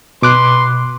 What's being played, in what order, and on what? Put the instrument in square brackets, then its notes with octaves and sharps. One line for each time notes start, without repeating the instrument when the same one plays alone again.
[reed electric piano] B2 D6 F#6 [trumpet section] B4 C6